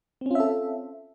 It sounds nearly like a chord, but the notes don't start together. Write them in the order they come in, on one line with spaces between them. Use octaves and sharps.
C4 C#4 F4 E5 A4